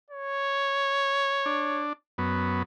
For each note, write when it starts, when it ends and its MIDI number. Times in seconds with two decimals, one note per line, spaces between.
0.10 1.86 73
1.46 1.93 62
2.18 2.63 42
2.18 2.63 59